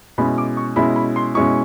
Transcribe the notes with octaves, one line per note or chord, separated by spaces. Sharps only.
B2 G#3 C#4 E4 B5
D6
C#6
B2 G#3 C#4 E4 B5
B5
C6
B2 G#3 C#4 E4 C#6